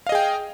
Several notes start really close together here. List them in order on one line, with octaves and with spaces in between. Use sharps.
F5 D#5 G#4 G5